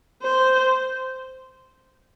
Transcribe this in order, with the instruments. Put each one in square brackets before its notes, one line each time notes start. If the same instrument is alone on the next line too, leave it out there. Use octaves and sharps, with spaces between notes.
[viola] C5